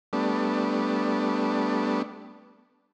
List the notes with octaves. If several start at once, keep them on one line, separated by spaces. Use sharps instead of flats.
G3 A3 B3 D4